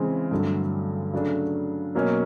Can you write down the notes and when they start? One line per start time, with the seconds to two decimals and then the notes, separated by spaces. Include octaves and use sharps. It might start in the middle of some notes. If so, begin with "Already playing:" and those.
Already playing: C#3 E3 G#3 C4
0.31 G2 D3 F#3 A3
1.13 C#3 F#3 A3 D4
1.95 B2 F#3 A#3 C#4